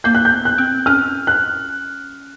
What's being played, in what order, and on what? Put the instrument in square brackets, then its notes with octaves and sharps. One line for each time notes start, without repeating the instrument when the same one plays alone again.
[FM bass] A#3 [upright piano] G6
[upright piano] F#6
G6
[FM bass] B3
[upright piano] F#6
[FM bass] C4
[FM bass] C#4 [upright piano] F6
[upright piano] F#6